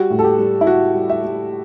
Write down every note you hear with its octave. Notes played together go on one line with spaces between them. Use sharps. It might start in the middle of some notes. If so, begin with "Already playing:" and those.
Already playing: G3 F#4
A2
A4
G4
G3
E4
G3 F#4
G3
E5
G3